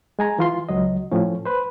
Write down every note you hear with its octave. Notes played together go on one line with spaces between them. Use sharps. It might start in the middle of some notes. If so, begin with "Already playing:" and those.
G#3 G#5 A#5
E3 F4 C6
C#2 F#3 D#5
A2 F3 C#4
B4 C5